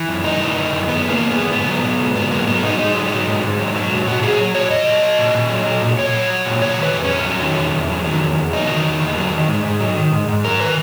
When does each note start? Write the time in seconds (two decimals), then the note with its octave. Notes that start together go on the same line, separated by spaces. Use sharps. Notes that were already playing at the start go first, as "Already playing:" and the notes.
Already playing: E3
0.09 F#2
0.24 F#2 D#4
0.40 E3
0.56 E3
0.72 F#2
0.88 F#2 B3
1.04 E3
1.09 A#3
1.20 E3
1.30 B3
1.36 F#2
1.52 G#2 B3
1.67 F#3
1.84 F#3
2.00 G#2
2.15 G#2 B3
2.31 F#3 A#3
2.47 F#3 B3
2.63 G#2 D#4
2.79 G#2 D#4
2.95 F#3
3.11 F#3
3.27 G#2
3.43 G#2
3.59 F#3
3.75 F#3
3.91 G#2
4.07 A#2 F#4
4.22 F#3 G#4
4.39 F#3
4.55 A#2 C#5
4.70 A#2 D#5
4.86 F#3
5.02 F#3
5.18 A#2
5.34 A#2
5.50 F#3
5.66 F#3
5.82 A#2
5.98 A#2 C#5
6.14 F#3
6.30 F#3
6.46 A#2
6.61 F#3 C#5
6.77 D#3
6.83 B4
6.93 E2
7.04 C#4
7.10 E2
7.26 F#3
7.41 D#3
7.57 E2
7.73 E2
7.89 F#3
8.05 D#3
8.21 E2
8.37 E2
8.53 F#3 D#4
8.69 D#3
8.85 E2
9.00 E2
9.17 F#3
9.32 D#3
9.48 G#2
9.64 G#2
9.80 F#3
9.97 D#3
10.12 G#2
10.28 G#2
10.44 F#3 A#4
10.60 D#3 B4